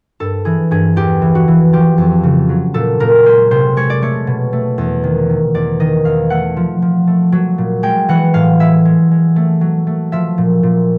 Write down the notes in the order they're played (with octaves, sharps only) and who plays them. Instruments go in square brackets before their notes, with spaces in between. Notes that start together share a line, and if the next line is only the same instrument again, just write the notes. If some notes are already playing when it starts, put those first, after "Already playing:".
[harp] G2 A4
E3 G#4
G2 G#4
E2 G4
E3
F#4
E3
F3 G4
F2
C#3
F#3
A#2 A4
A#2 A#4
G#3 C5
C3 C5
G#3 C#5
D5
A3 C#5
B2
A3
E2
D#3
D#3
E2 D5
D#3 D#5
E2 F5
A3 F#5
F3
F3
A3
F#3
A#2
G#3 G5
E3 F#5
A2 F5
G#3 E5
G#3
G#3
A3
F#3
A3
F3 E5
A#2
A#2